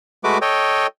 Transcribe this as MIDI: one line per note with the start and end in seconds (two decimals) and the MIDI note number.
0.24 0.38 56
0.24 0.38 57
0.24 0.38 66
0.24 0.38 71
0.24 0.38 86
0.41 0.87 69
0.41 0.87 73
0.41 0.87 75
0.41 0.87 79